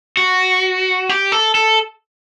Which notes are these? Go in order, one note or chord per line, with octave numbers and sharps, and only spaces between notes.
F#4
G4
A4
A4